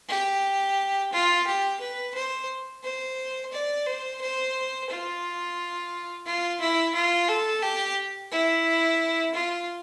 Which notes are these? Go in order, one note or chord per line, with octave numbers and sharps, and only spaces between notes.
G4
F4
G4
B4
C5
C5
D5
C5
C5
F4
F4
E4
F4
A4
G4
E4
F4